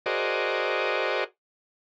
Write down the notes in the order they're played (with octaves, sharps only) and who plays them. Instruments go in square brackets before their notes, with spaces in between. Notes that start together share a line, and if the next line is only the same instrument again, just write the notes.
[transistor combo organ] F#4 G#4 A#4 C5 D5 D#5